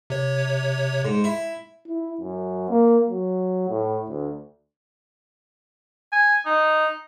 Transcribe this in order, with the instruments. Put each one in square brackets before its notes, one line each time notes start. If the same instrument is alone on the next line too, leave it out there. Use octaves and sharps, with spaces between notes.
[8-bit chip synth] C3 C#5
[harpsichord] G#2
E4
[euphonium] E4
F#2
A#3
F#3
A2
D2
[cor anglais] G#5
D#4